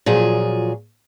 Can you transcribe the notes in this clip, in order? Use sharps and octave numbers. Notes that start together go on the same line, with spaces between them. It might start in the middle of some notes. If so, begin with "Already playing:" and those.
A#2 F3 F#3 G#4